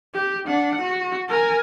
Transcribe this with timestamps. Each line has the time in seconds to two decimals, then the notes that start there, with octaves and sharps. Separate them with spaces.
0.14 G4
0.47 D4 F#5
0.82 F#4
1.29 A#4 G#5